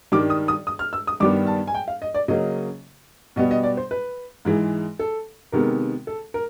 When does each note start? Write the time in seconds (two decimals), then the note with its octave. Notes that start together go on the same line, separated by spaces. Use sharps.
0.12 G2 D#3 G3 D6
0.30 D#6
0.48 D#6
0.67 D#6
0.79 F6
0.93 E6
1.07 D#6
1.20 G2 D#3 G3 B3 D6
1.47 A5
1.68 G#5
1.74 G5
1.88 F5
2.02 D#5
2.14 D5
2.28 C#3 F#3 A#3 D#5
3.36 B2 G3 B3 D#5
3.51 D#5
3.63 D5
3.77 C5
3.91 B4
4.45 G#2 E3 G#3
4.99 A4
5.52 C3 D#3 G#3 B3 A#4
6.07 A4
6.34 A#4